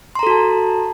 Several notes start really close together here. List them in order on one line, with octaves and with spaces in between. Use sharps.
C6 A#5 A4 F#4 A5